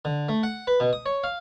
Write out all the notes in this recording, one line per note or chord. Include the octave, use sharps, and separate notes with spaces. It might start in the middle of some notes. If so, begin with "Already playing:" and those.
D3
A3
F#5
B4
B2
D#6
C#5
F5